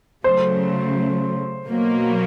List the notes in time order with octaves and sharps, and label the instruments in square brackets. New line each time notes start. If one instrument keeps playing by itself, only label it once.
[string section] C#3 F#3 A3 [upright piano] C5
[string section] B2 F#3 A#3